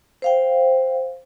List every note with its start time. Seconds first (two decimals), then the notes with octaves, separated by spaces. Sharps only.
0.22 C5 F5 G5